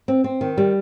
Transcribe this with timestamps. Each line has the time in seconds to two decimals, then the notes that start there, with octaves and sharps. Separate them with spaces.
0.08 C4
0.24 C4
0.41 D#3
0.58 G3